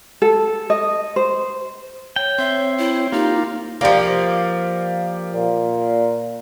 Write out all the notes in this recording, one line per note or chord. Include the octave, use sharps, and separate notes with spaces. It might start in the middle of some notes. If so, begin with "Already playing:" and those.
A4
D#5
C5
C#5 G5
C4 E5
E4
A#3 D#4 F4 G4
F3 A#3 G4 D5 F5
A#2